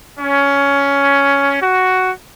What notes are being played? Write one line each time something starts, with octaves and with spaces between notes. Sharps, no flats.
C#4
F#4